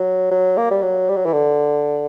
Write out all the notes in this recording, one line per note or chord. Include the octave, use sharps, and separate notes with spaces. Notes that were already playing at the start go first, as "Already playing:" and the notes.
Already playing: F#3
F#3
A#3
G3
F#3
G3
F#3
E3
D3